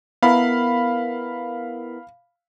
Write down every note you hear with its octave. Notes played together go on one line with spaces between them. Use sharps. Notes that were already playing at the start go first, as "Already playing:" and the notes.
B3 E4 A#4 F5 B5